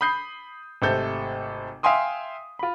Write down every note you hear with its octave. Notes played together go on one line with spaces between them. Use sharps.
B5 D#6 G6 C7
G#1 C3 A3 A4 G6
E5 F5 G5 G#5 C6 D#6
F4 B5